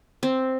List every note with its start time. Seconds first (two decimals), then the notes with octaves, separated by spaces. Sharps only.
0.23 C4